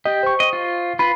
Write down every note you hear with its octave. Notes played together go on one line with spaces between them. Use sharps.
G4 D#5
C5 C#6
D#5
F4
F4 B4 B5